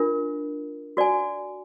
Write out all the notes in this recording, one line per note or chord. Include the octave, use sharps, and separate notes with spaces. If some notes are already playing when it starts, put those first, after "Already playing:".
Already playing: D4 F4 A#4
F#4 D5 G#5